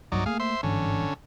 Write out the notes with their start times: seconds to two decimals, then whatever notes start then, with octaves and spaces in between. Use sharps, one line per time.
0.12 C2 G2 F#3 G3 D#4 D5
0.26 A3 A#3 G#4 F5
0.40 C5 E5 C6
0.63 G1 G#2 D3 E3 C#4